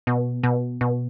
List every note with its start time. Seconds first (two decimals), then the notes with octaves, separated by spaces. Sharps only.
0.07 B2
0.43 B2
0.81 B2